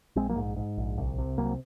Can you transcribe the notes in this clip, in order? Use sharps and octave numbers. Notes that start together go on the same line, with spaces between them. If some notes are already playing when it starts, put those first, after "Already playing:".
A#1 G#3 C4
F#3 A#3
G#2
G#2
A#1
C2
C3
C2 F#3 A#3